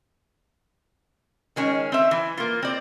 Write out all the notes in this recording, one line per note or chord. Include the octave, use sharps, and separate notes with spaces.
D#3 G#3 C#4
C4 E5
E3
A#3 F4
C4 D5